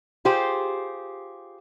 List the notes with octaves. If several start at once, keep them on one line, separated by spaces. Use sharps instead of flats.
F4 G4 G#4 C5